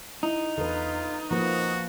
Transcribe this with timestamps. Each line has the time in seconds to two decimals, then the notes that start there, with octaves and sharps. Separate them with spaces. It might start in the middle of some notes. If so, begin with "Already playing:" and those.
0.23 D#4 E4
0.58 E2 D3 F4 A4 B4
1.31 F3 A#3 F#4 B4 A#5